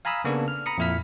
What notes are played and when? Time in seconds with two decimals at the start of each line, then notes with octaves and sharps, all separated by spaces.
0.05 F5 G#5 A#5 B5 D#6 E6
0.24 C#3 A#3 B3 D4 A4
0.48 F6
0.66 A#5 B5 D#6 C#7
0.78 F2 A#2 E4 F6 B6